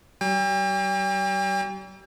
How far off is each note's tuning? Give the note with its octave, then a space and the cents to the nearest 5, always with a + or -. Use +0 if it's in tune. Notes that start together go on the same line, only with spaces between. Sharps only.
G3 -45 G5 +40